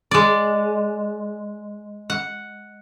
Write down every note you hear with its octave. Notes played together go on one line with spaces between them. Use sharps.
G#3 D5
F#5